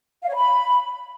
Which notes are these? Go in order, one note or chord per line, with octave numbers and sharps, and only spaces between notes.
F5
C#5
B5